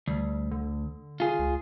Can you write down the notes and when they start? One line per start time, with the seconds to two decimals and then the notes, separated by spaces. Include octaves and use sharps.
0.08 D2 G3
0.51 D3
1.20 F4 G#4
1.39 C#2